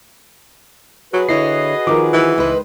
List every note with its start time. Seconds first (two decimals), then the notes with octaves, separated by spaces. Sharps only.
1.13 F#3 F#4 G#4 B4
1.28 D3 E4 C#5 D#5 C7
1.87 D#3 F3 A#4 D6
2.13 E3
2.38 C#2 D#3 G#3 B4 C5